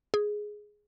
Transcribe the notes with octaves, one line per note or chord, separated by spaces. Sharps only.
G#4